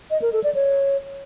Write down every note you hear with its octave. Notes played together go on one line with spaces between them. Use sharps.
D#5
A#4
A4
D5
C#5